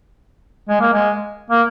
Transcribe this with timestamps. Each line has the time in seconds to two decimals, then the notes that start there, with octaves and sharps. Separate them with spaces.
0.69 G#3
0.81 A#3
0.93 G#3
1.50 A#3